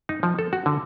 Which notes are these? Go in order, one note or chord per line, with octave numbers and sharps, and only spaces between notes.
D#4
F3
A4
F#4
D3